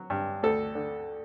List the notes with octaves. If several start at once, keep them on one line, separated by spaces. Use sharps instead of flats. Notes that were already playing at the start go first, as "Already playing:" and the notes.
Already playing: F#3
G2
D2 A4
D3